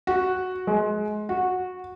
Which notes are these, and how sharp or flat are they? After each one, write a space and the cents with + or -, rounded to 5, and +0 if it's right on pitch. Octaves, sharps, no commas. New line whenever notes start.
F#4 -5
G#3 +25
F#4 -15